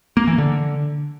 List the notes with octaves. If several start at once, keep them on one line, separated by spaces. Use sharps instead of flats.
A#3
E3
D3